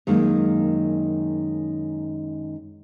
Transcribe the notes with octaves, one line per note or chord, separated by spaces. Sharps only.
F#2 D#3 G#3 A#3